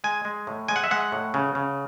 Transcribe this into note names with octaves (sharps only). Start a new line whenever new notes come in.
G#3 G#5
G#3
A2
G#3 G#5
F#5
E5
G#3 F#5
A2
C#3
C#3